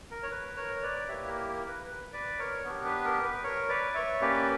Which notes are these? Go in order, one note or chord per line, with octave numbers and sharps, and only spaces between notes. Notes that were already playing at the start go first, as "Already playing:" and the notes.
A#4
C#5
B4
A#4 C#5
B4 D5
A#3 E4 G4 C#5 E5
A#4
A#4
B4
B4
B4 D5
A#4 C#5
B3 D4 G4 A#4
B4
A#4
B4
A#4 C#5
B4 D5
C#5 E5
A#3 C#4 G4 B4 D5